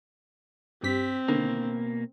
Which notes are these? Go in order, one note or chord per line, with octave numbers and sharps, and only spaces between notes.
G2 C4 G4 B6
B2 D3 D#3 A#3 B3